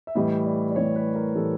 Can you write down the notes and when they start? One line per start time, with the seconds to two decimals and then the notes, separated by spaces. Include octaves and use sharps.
0.07 E5
0.15 A2 E3 G3 D#5
0.46 D5
0.71 D5
0.76 A2 E3 G3 C#5
0.96 B4
1.15 A#4
1.36 A2 E3 G3 A4